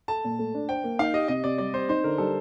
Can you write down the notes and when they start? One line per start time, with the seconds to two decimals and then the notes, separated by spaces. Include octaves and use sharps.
0.08 A4 A5
0.24 A#2
0.39 A3
0.54 D4
0.69 C5 G5
0.84 A#3
0.99 D#4 F5
1.13 G4 D#5
1.28 C3 D#5
1.44 C3 D5
1.58 G3 D5
1.73 C4 C5
1.89 D#4 C5
2.04 D3 A#4
2.18 G3 A4